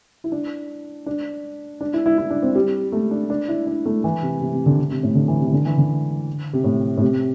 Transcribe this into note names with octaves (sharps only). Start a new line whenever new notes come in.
E4
D4
D4
D4
E4
E4
E4
D4
C4
G3
A3
D4
D4
E4
D4
A3
E3
C3
C3
C3
D3
C3
C3
A2
D3
E3
C3
E3
D3
E3
D3
C3
A2
A2
C3